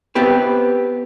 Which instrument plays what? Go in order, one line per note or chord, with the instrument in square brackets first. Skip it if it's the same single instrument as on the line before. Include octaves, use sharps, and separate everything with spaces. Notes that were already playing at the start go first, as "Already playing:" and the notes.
[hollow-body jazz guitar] B3 C4 G4 B4